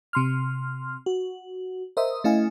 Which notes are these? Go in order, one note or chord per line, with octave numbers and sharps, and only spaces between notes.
C3 C6 F6
F#4
A#4 C5 D#5 E5 D#6
A3 C#4 E4 D#5 F5 G#5